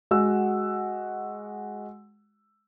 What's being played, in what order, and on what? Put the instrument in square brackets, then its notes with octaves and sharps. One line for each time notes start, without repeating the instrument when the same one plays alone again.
[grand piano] G#3 F#4 F#5 E6